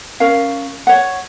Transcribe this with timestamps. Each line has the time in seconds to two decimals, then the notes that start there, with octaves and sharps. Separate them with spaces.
0.20 C#4 A#4 F5
0.87 C#5 F#5